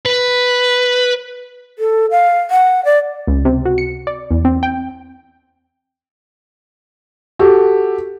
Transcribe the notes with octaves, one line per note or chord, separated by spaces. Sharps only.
B4
A4
F5
F#5
D5
C#2
C3
F#4
C#7
D5
E2
C4
G5
F#4 G4 A4